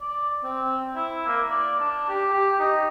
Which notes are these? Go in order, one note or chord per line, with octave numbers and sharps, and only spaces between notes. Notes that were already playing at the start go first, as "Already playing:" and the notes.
D5
C4
E4
A#3
D5
D4
G4
G4
D#4